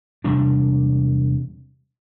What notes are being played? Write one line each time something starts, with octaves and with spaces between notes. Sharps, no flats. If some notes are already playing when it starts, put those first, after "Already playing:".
E1 C3 G3 D4